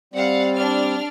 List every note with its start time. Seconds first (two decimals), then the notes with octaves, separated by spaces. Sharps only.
0.14 G3 C4 D5 F5 F#5
0.55 D4 F6